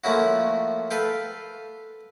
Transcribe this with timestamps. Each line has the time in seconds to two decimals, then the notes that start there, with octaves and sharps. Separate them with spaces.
0.04 F3 A3 A#3 C#4 E4 F#4
0.91 A4 B4 F5 G5